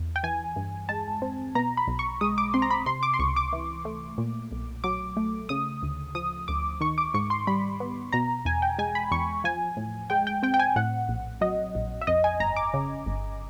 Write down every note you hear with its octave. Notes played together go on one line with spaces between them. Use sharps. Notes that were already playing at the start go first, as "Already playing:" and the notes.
Already playing: E2
G5
E3 G#5
G2
G#3 A5
C4
B2 A#5
B5
B1
C#6
G#3 D#6
D6
C4 C6
A#5
B5
C3 C6
D6
C6
C#2 C#6
D6
E3
A3
A#2
B1
F#3 D6
A3
C#3 D#6
D2
F3 D#6
D2 D6
D#3 C#6
D6
G#2 C#6
C6
G3 B5
B3
B2 A#5
E2 G#5
G5
G#3 G#5
B5
E2 C#6
F3 G#5
A2
G#3 G5
G5
C4 G5
G5
G#5
A2 F#5
A#1
F#3 D#5
A#1
E5
F2 D#5
G#5
G1 A#5
D6
C#3
G1